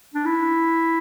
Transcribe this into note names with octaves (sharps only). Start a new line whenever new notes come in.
D4
E4